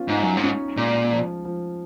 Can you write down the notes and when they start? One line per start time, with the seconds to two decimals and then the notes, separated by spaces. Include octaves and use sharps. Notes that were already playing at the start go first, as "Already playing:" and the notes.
Already playing: B3 C#4 F4
0.08 G#2 D#4
0.22 F#2
0.37 G#2
0.43 C#4
0.77 A#2 G#3
1.12 F3
1.45 F3